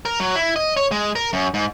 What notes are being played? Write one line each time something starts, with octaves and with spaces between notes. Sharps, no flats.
A#4
F#3
E4
D#5
C#5
G#3
A#4
F#2
G#2